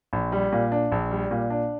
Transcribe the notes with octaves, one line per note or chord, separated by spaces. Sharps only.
A#1
G3
A#2
D4
A#1
G3
A#2
D4